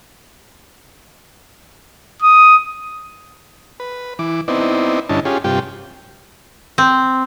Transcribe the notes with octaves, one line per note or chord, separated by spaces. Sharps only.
D#6
B4
E3 D6
B3 C4 D#4 E4 D5
G2 D3 C#4 E4 D#5 A5
C#4 F4 G4 G#4
G2 C3 F4 G4 G5
C4